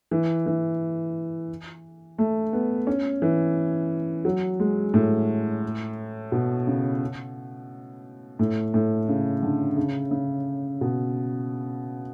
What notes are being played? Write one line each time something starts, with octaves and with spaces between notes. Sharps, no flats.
E3
E3
A3
B3
C#4
E3
F#3
G#3
A2
B2
C#3
A2
A2
C#3
D3
C#3
C#3
B2